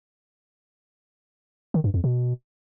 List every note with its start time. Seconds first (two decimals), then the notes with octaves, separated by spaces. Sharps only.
1.74 D#3
1.84 G2
1.94 F2
2.04 B2